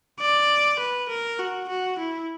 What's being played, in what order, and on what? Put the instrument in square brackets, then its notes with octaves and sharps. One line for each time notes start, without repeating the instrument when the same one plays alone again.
[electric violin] D5
B4
A#4
F#4
F#4
E4